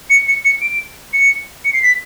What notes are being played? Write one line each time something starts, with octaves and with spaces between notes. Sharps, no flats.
C#7
C#7
C#7
D7
C#7
C#7
C7
B6